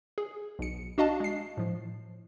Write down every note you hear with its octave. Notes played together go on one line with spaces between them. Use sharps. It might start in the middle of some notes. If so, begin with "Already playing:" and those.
G#4
B1 C#7
D4 F#4 D#5 F5 A5
G#3 C7
A2 F3